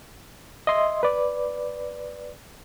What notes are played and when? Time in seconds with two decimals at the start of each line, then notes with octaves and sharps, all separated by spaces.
0.67 D#5 E5 C6
1.03 B4 D5